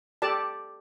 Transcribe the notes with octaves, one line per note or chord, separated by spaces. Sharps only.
G4 A4 D5 A5